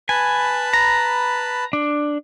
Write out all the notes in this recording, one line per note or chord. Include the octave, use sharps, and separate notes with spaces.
B4 G#5 A5 B5
A#5
D4